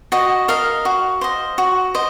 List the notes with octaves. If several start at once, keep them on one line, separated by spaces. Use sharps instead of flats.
F#4 D#5
A#4 D#5 F5
F#4
C5 D#5
F#4
C5 D#5